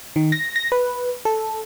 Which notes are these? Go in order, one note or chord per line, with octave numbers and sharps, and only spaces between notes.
D#3
A#6
A#6
B4
A4